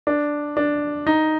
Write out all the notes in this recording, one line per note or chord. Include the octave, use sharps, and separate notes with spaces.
D4
D4
D#4